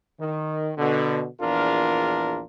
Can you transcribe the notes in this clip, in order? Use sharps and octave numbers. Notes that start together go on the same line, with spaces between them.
D#3
B2 D3
A#1 E2 D4 F4 A#4